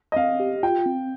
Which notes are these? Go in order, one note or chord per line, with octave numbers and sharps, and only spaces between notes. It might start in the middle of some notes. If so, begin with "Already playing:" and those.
D#5
C4 F5
G4
F4 G5
C4